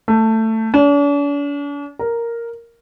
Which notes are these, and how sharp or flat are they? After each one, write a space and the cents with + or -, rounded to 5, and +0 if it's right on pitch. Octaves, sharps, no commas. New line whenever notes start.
A3 +15
D4 -45
A#4 +0